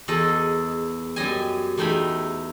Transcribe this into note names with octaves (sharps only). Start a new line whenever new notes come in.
E2 G#4 A4 D#5
F#2 G3 D#5 G#5
E2 A3 D#4 G5 G#5 B5